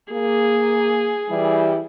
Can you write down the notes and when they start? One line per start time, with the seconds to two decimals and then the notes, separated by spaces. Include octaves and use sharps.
0.12 A#3 G#4
1.29 E3 G3 E4